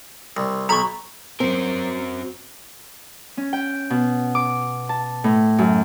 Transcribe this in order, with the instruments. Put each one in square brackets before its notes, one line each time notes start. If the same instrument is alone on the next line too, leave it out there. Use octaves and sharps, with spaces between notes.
[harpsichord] C2
[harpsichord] B1 B5 [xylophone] A#5 C#6
[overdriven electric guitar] F#3 A#4 [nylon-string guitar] C4
[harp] C#4
G5
B2
D6
A5
A2
F#2